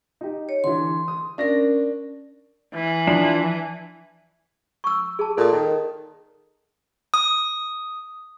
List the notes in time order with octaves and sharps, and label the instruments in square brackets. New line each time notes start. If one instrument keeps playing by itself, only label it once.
[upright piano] D#4 G4
[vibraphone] C#5
[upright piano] D3 E3 [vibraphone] C6
[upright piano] D#6
[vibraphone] C#4 A#4 [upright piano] D4 A#6
[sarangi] E3
[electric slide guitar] F3 D4
[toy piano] C#6 E6
G#4 A5
[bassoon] A#2 [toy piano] A4 D#5 D#6
[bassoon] D#3
[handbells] D#6